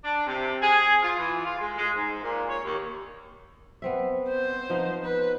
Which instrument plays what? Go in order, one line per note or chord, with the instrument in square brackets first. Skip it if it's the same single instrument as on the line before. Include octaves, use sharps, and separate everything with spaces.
[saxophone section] D4
C3
G#4
F4
E3
F4
G#3
G#3
G#2
A#2
C#5
D#2
[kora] B3 C4 E5
[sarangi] C5
[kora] F3 B3 D#4
[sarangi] B4